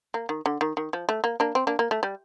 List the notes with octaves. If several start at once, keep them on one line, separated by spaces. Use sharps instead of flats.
A#3
D#3
D3
D#3
D#3
F3
A3
A#3
A#3 D4
C4
A#3 D4
A#3
A3
G3